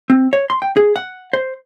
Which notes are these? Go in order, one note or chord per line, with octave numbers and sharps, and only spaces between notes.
C4
C#5
C6
G5
G#4
F#5
C5